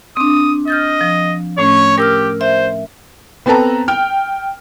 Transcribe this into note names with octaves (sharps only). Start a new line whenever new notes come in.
C4 D4 D#6
D#5 F6 G6 A6
F3
A2 A3 C#4 C#5
G4 A#4 E6 F6
C5 E5
B3 C4 A4 B4 A5 A#5
G5 F6